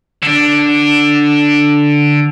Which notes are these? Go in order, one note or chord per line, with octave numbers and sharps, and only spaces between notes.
D3 D4